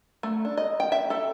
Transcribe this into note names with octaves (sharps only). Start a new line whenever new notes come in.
A3
D4
D#5
G5
E5
A4